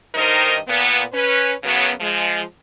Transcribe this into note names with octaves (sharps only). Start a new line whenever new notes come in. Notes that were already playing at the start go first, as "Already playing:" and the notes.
G2 D#3 D#4 A#4 C5 D#5
A#2 B3
C#4 B4
F#2 C#3 F#3 B3
F3 G#3